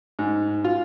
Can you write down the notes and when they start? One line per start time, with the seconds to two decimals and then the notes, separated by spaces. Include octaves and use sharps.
0.19 G#2
0.64 F4